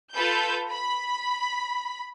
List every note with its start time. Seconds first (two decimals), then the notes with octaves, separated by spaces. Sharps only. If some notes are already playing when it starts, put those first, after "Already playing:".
0.13 F4 A4 B4 G6
0.72 B5